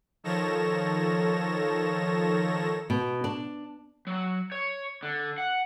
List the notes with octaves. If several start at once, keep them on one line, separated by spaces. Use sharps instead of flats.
D#3 F3 A4 C#5 A#6 E7
B2
D4
F#3
C#5
D3
F#5